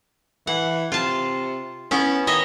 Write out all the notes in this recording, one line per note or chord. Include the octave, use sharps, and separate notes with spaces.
E3 F#5
C3 F4 A5
B3 C#4 E4
D#3 C#5 D#5 E5